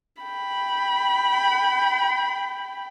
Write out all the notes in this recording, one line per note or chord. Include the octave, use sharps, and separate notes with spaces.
G5 B5